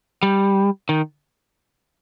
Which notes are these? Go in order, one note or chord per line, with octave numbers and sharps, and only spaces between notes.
G3
D#3